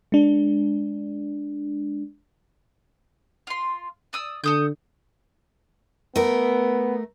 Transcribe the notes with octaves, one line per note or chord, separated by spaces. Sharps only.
G#3 D4
F4 C6
D5 D#6 E6
D3 A4 D#6 G6
A3 B3 A#4